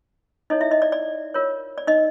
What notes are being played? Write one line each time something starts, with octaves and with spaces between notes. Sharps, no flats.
D#4 E4 A4 C#5 D#5
E4 E5
D#4 D#5
D5
D5
F4 A#4 C#5
D5
D#4 D#5